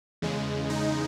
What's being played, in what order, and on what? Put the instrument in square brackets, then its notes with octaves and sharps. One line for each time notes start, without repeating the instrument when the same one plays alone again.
[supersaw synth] E2 C#3 G#3
D#4